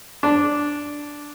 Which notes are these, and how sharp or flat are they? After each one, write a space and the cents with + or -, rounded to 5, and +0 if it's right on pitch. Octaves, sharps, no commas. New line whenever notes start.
D4 -5